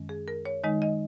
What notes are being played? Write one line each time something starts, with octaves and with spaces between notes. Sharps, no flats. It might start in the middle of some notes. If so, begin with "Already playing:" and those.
Already playing: F#2 D#3 G#3 C#4
G#4
A#4
C#5
D#3 G#3 D#4 D#5
D#5